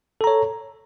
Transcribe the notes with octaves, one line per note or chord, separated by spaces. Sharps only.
A4 C#5 A#5